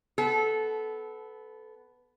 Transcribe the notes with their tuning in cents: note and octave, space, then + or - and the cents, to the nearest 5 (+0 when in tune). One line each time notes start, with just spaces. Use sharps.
B3 +10 A4 -15